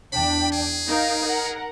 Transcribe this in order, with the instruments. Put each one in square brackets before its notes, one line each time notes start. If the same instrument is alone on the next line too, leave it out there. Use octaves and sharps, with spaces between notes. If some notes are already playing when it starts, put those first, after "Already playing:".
[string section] E2 D4 G5 [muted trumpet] B5
[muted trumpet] G#4
[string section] D#4 A#4 F5
A#4 F#5